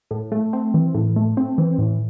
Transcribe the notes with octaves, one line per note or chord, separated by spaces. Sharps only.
A2
A3
C4
E3
A2
A3
C4
E3
A2